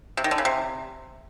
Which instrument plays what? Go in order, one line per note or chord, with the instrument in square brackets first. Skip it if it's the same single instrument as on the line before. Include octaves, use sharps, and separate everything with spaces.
[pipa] C3
D#3
D3
C#3
C3